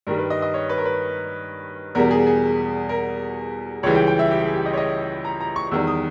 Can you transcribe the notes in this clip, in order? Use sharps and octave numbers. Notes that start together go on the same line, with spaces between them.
G2 D#3 G3 A#4
B4
D#5
D#5
C#5
B4
A#4
B4
E2 B2 G3 A#4
G#4
G#4
A#4
C#2 C#3 E3 G3 C#5
G5
G5
E5
G4
G#4
G4
D#5
C#5
D#5
A#5
A#5
C#6
E2 D#3 G3 E6
D#6